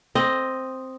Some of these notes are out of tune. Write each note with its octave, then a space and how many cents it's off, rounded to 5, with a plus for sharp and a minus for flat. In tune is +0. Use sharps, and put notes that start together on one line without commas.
C4 +0 D#5 +0